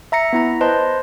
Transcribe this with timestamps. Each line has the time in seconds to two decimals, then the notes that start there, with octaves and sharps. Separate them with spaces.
0.12 E5 A#5 A#6 C#7
0.33 B3 E4 A#5
0.61 B4 C5 D#5 A5 C6